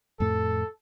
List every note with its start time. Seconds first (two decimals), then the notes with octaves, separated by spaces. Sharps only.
0.20 F2 A2 A3 A4